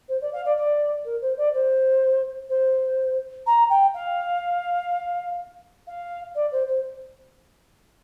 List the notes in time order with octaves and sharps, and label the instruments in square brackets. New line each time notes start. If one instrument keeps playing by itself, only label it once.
[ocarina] C5
D5
F5
D5
D5
A#4
C5
D5
C5
C5
A#5
G5
F5
F5
D5
C5
C5